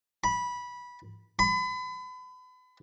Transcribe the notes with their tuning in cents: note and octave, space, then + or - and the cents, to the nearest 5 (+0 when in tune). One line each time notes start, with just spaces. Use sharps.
B5 -15
B5 +35